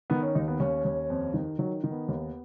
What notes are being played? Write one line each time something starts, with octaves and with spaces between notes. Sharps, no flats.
D#3 B3
C#4
D#2 D#4
B3
D#2 C#4
D#2
F2
D#3
D#3 F#3
D#3
B3
D#2